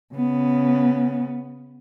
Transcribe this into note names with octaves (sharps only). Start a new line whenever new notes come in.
C#3 B3